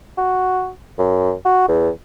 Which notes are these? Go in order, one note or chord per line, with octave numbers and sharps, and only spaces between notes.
F#4
F#2
F#4
E2